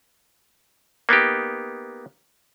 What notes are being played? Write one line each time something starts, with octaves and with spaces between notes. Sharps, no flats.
A#3 B3 D#4 G4